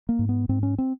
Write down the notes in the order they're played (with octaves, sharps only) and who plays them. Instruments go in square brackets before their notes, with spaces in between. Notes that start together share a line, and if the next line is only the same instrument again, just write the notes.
[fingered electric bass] A#3
G#2
B3
G#2 C4
C#4
C4